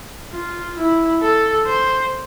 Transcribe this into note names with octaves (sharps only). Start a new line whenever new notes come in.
F4
E4
A4
C5